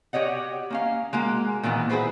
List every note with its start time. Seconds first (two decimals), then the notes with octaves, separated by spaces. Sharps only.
0.13 F#4 G4 C#5 D#5 F#5
0.70 A#3 C#4 F5
1.13 G#3 A#3 F#4
1.63 A#2 D#3 E3 B3
1.90 E4 F#4 G#4 B4 C5